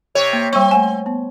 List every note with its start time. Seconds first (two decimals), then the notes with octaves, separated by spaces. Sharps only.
0.15 C3 C#5
0.33 A#3
0.53 G3 C4 C#6
0.71 A3 G#5
1.06 B3